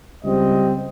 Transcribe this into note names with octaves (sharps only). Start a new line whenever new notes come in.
C#2 G3 C4 D#5